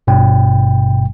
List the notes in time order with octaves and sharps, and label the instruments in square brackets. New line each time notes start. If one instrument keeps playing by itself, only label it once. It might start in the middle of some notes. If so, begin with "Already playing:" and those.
[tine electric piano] G#1 G2 B2 G5